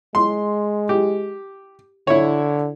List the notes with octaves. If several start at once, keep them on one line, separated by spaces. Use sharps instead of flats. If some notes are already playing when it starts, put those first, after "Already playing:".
G#3 C6
G4
D3 E4 C#5